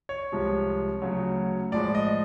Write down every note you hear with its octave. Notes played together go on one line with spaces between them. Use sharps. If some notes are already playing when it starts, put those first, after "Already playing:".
C#5
C2 C3 F3 G#3
D2 C#3 F#3
A2 F3 G#3 D5
D#5